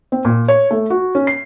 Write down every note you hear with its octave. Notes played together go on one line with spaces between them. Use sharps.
C4
A#2
C#5
A3
F#4
C#4
C7